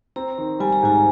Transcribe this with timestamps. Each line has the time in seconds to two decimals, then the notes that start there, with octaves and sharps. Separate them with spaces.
0.16 C4 A#5
0.38 D#3
0.60 G3 G#5
0.73 A#5
0.83 G#2 G#5